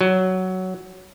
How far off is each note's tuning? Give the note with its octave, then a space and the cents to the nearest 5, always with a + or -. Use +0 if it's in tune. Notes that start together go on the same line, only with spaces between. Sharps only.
F#3 +10